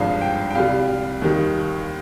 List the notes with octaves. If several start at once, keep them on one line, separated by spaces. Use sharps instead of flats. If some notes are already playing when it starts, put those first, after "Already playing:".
Already playing: G#1 G2 F3 G#3 F5
G5
G5
C2 C3 G3 F5
D#2 D#3 G3